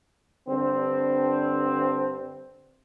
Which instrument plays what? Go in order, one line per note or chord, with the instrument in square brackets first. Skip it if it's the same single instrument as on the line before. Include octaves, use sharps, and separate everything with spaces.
[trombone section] G2 D3 C4